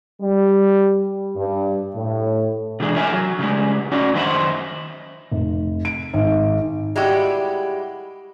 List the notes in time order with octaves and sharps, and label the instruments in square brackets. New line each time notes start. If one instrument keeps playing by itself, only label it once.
[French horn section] G3
G2
A2
[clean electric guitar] C3 E3 G#3 D4
A#4 C#5 E5 G#5
F#3
C#3 G3 G#3
C#4 D#4 F#4 D5
F#2 D#3 D#4 C5 E5 B5
[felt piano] F1
D7
G#1
[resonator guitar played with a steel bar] G3 G#3 E4 F#4 G4